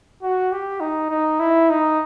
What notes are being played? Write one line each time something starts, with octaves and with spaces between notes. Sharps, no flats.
F#4
G4
D#4
D#4
E4
D#4